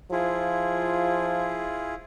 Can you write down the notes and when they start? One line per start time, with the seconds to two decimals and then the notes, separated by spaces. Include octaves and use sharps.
0.12 F3 E4 F4 G#4